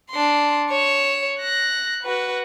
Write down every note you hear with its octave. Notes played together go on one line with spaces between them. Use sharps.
D4 C6
C#5 E7
F#6 A#6
F#4 B4